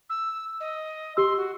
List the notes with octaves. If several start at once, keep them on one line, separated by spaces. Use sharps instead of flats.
E6
D#5
G4 C6 E6
F#4